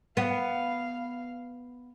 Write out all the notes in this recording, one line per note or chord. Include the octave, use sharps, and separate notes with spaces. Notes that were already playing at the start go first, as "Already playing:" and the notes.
B3 F5